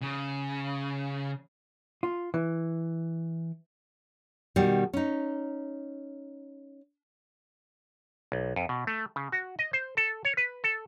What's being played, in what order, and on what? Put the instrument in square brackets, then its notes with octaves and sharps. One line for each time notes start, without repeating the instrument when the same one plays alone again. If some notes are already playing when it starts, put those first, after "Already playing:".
[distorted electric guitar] C#3
[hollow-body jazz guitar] F4
E3
[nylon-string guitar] B2 D#3 G3
C#4 D#4
[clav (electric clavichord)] B1
F2
B2
A3
C#3
F#4
D#5
C5
A4
C#5
B4
A4